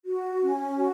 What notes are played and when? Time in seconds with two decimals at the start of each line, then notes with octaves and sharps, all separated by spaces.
0.05 F#4
0.42 C#4
0.77 F#4